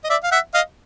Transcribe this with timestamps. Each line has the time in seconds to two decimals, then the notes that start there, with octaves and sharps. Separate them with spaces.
0.04 D#5
0.09 D5 E5
0.23 F5
0.31 E5 F#5
0.54 D#5 F5